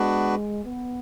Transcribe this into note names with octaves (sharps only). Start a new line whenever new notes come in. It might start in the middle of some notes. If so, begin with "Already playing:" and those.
Already playing: G#3 B3 D4 F#4 B4
B3